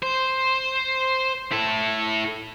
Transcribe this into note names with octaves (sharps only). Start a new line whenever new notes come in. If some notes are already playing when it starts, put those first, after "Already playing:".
C5
E4 A4